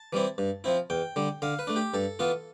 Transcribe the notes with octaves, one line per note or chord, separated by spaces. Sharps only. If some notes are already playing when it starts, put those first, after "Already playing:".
Already playing: A5
E3 G3 C4 E4
G2
F3 C4 E4
E2 G5
D3 G3
D3 F5
B4
A3 D4
G4
G2 A4
E3 B3 F4